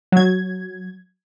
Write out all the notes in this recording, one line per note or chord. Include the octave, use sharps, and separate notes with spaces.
F#3 G#6